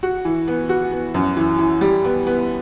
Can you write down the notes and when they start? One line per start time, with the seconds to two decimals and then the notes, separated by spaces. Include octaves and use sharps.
0.03 F#4
0.25 E3
0.48 B3
0.69 F#4
0.92 B3
1.14 F#2
1.36 E3
1.59 E3
1.81 G3
2.04 B3
2.27 B3